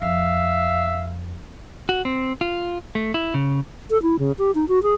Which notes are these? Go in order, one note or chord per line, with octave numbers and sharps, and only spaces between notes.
F2 E5 F5
F#4
C4
F4
A3
E4
C#3
A4
E4
C#3
G4
D#4
F#4
G#4